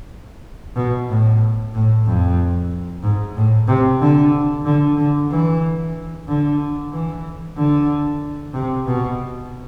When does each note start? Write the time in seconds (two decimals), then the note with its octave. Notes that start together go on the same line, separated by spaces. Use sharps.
0.76 B2
1.09 A2
1.74 A2
2.06 F2
3.03 G#2
3.36 A2
3.68 C3
4.01 D3
4.65 D3
4.97 D3
5.30 E3
6.28 D3
6.92 E3
7.57 D3
8.53 C3
8.87 B2